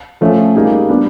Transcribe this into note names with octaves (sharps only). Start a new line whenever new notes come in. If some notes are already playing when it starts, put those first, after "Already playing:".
F3 A3 C#4
G3 A#3 D#4 G#4
G3 B3 D4